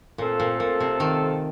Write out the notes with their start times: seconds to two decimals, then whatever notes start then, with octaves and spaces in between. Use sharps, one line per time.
0.18 A#2 A3 C4 F4 A4
0.40 A#2
0.60 A#2
0.80 C3
1.00 D#3